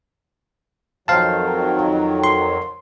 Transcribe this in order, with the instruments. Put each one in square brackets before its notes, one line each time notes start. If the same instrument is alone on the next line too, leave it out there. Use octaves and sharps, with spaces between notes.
[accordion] F2 D#3 F#3 [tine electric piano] C5 F5 A5
[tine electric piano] C6